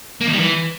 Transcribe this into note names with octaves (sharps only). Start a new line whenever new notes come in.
A#3
D#3
G3
E3